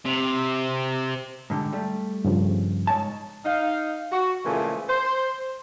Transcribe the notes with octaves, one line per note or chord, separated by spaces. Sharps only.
C3
G#2 D3 G4
G3 A3
G2 C#3 F3
G#2 C#5 A5
D#4 F5
F#4
A#2 C#3 E3 F3 G#3 A3
C5 C6